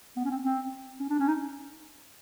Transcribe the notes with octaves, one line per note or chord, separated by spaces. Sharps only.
B3
C#4
C4
C4
C#4
D4
C#4
D#4